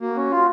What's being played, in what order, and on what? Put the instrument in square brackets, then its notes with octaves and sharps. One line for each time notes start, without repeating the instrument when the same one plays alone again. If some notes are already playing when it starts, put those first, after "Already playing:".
[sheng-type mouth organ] A#3 [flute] F#4
[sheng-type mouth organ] C#4
F4